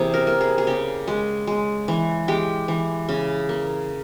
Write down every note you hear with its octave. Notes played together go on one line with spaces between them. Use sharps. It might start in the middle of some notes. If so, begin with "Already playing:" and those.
Already playing: C3 E3 A#3 E4 G#4
A#4
A#3
G#4
G#4
C#3 G4
G#3
G#3
E3
G#3 G4
E3
C#3
A#3